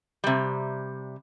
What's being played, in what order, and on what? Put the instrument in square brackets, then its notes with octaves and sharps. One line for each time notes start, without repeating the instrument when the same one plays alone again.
[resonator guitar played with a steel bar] C3 G3